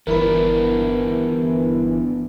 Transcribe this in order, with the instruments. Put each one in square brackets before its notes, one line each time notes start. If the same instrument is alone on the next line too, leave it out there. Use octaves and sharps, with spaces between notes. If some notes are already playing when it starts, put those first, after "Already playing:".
[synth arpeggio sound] G1 E3 [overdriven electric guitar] B3 D4 [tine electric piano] A#4 B5